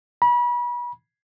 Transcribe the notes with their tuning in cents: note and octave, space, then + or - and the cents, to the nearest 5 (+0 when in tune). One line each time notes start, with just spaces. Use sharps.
B5 -35